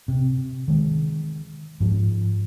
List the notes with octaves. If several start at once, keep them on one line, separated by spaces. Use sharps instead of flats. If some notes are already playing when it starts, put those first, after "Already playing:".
C3
D#3 G#3
G#2 F3